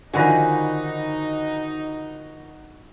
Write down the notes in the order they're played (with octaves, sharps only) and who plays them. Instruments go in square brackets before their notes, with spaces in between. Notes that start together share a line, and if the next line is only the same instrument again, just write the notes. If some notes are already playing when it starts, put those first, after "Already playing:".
[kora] D3 D#3 F3 [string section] D#4 [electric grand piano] F#4 F#5 B5 [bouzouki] G#5